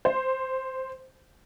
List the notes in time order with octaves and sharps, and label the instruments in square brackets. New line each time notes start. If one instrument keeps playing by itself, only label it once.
[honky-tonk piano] C5